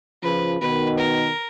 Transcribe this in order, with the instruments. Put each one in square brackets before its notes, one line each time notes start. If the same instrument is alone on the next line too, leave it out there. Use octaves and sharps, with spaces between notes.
[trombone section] C#3 F3 [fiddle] B4
[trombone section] B2 D#3 [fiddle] B4
[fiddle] A#4